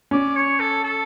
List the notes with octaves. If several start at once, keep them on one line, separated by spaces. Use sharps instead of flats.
C#4 D5
C#5
A4
A4